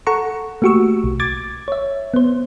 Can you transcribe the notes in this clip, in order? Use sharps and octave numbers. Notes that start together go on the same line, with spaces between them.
A4 F#5 A#5 C#6
A3 A#3 F#4 G4 C#6 E6
B1
D6 G#6 A6
C#5 E5
B3 C5